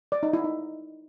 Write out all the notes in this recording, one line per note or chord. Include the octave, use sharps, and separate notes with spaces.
D5
D#4
E4
D#4